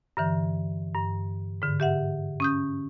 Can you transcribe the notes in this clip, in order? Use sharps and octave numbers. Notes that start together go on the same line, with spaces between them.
G2 D3 E3
G2
G#2 D3
G4 E5 F#5
C#4 D#6 G6